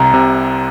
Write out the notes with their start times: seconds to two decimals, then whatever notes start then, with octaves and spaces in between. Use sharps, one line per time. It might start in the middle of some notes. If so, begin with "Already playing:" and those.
Already playing: C2 C3 A#5
0.14 C3